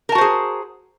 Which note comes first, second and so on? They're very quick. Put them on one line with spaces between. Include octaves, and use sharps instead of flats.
A#4 A5 F#4 C5 G#4